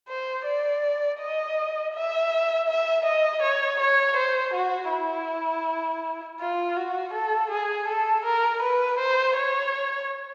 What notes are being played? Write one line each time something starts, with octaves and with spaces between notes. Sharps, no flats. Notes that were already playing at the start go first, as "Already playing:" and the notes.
C5
D5
D#5
E5
E5
D#5
C#5
C#5
C5
F#4
E4
F4
F#4
A4
G#4
A4
A#4
B4
C5
C#5